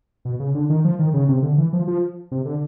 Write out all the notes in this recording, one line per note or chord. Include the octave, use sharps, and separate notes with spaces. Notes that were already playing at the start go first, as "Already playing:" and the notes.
B2
C#3
D3
D#3
F3
D#3
C#3
C3
D3
E3
F3
F3
C3
D3